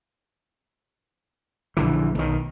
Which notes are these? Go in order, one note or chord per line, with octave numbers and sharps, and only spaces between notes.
A#1 D3 E3
B1 D#3